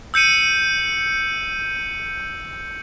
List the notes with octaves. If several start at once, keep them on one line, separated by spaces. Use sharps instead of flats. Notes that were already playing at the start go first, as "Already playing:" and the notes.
E6 G6 C#7 D#7